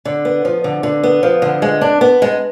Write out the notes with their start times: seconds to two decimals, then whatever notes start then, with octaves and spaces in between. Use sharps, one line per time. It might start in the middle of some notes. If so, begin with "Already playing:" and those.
0.05 D3
0.25 B3
0.45 F3
0.64 D3
0.83 D3
1.03 B3
1.23 F3
1.42 D3
1.62 G#3
1.81 D4
2.01 B3
2.22 G#3